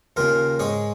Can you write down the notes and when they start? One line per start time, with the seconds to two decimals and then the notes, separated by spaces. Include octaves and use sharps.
0.16 D#2 C#3 A#3 F4 A#4
0.59 G#2 G#3 G#4 C#5